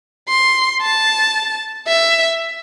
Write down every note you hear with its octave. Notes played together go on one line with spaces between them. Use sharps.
C6
A5
E5